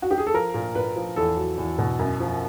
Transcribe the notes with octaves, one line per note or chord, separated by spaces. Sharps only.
F#4
G4
G#4
A4
F3 A#4
A#2
A#2 B4
F3
E2 A4
F#3
E2
B2
F#2
F3